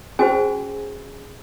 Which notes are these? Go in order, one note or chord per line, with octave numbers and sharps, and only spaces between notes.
C#4 F#4 G#4 C5 G#5